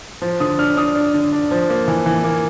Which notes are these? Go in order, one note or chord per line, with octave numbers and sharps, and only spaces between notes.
F3
D3 D#6
D4 F6
D4 D#6
D4
D3
D4
F3
A#3
E3
E3
A#3